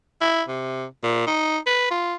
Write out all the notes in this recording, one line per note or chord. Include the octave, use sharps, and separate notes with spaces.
E4
C3
A#2
D#4
B4
F4